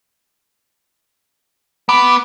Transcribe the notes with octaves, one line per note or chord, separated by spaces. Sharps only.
B3 D6